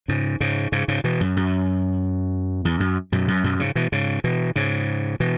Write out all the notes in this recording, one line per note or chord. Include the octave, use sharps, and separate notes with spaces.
G#2 C#3
G#2 C#3
G#2 C#3
G#2 C#3
B2 E3
F#2
F#2
E2
F#2
F#2 B2
F#2
F#2 B2
G#2 C#3
B2 E3
G#2 C#3
B2 E3
G#2 C#3
B2 E3